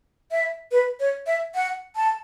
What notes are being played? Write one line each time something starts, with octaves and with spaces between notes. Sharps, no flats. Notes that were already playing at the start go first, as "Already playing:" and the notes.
E5
B4
C#5
E5
F#5
A5